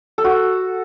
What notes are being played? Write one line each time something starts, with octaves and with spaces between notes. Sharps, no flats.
A4
F#4